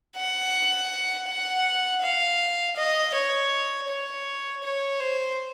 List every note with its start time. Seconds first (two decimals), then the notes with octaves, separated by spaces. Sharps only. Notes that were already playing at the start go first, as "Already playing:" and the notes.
0.16 F#5
1.28 F#5
2.02 F5
2.76 D#5
3.14 C#5
3.88 C#5
4.63 C#5
5.00 C5